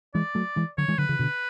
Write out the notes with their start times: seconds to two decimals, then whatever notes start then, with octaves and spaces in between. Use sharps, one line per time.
0.14 E3 G#3 D5
0.35 F#3 A3
0.56 E3 G#3
0.78 D3 F#3 C#5
0.88 E3 G#3
0.98 D3 F#3 B4
1.09 C#3 E3
1.19 B2 D3